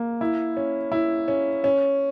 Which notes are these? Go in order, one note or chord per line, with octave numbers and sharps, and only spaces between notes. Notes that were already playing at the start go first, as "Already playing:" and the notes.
Already playing: A#3
E4
C#4
E4
C#4
C#4